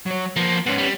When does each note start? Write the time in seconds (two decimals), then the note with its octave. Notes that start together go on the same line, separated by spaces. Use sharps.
0.06 F#3 C#5
0.36 F3 A#3 B3
0.66 G#2 B3 C#4
0.78 G3